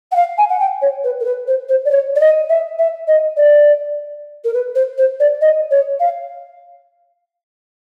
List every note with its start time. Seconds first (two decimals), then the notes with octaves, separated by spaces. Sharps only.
0.11 F#5
0.16 F5
0.38 G#5
0.49 F#5
0.59 G5
0.82 C#5
1.04 B4
1.20 A#4
1.25 B4
1.47 C5
1.69 C5
1.85 D5
1.91 C#5
2.15 D5
2.20 D#5
2.49 E5
2.78 E5
3.07 D#5
3.37 D5
4.44 A#4
4.53 B4
4.75 C5
4.97 C5
5.20 D5
5.41 D#5
5.71 C#5
6.00 F5